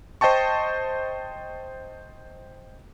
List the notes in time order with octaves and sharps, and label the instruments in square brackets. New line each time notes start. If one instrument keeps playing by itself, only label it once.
[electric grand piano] C5 D#5 G5 A5 C#6